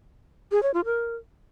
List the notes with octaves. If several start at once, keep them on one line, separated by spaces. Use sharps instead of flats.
G#4
C#5
F4
A#4